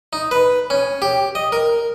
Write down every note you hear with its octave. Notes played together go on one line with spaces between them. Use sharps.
D#4
B4
C#4
G4
D#5
A#4